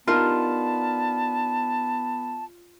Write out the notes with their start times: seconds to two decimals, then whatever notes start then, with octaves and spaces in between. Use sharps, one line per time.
0.07 B3 D4 D#4 F4 A#4 A5